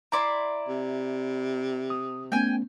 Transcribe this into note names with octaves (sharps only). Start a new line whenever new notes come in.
E4 D5 A#5 C6
C3
D#6
A3 B3 C#4 G5 G#5